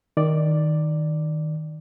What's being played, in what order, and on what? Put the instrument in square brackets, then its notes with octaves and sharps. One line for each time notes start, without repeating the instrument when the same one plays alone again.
[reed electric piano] D#3 D5